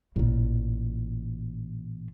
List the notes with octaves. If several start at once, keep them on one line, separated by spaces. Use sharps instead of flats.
A1 A#2